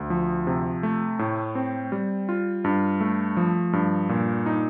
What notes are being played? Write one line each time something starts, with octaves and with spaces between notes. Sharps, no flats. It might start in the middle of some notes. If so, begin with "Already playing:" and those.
Already playing: D2
F3
C3
A3
A2
C4
G3
F4
G2
A3
F3
G2
A#2
D#4